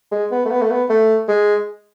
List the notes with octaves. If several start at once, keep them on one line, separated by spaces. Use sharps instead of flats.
G#3
B3
A3
B3
A3
B3
A3
G#3